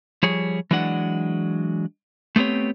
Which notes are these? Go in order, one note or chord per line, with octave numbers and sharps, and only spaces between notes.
F3 G3 G#4 C#5
E3 F#3 G#3 D4 D5 F#5
A3 B3 C4 G4 C#5